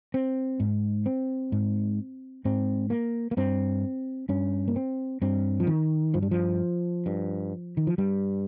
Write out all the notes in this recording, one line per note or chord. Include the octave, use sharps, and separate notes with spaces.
C4
G#2
C4
G#2
G#2 C4
A#3
A#3
G2 C4
G2 C#4
A#3
C4
G2 C4
F3
D#3
G2 F3
G3
F3
G2
D#3
F3
G2 G3